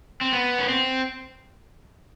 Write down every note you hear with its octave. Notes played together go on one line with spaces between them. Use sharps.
C4
B3
C#4
C4